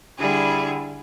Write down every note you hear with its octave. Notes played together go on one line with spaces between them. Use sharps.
D3 G3 E4 G#4